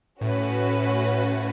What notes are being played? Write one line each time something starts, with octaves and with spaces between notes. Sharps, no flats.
A2 C#4 F#4 B4